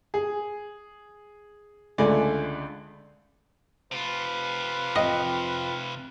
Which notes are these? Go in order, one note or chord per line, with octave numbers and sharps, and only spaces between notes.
G#4
C#2 D3 A3 D5 G#5
C3 F4 B4 F5
F2 D#5 G5